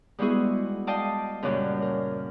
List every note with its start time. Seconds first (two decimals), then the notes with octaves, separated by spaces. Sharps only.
0.19 G3 G#3 B3 E4 F#4 G#4
0.87 D5 D#5 F5 G5 A5 D#6
1.43 F#2 A#2 C#3 F#3 G3
1.82 A#4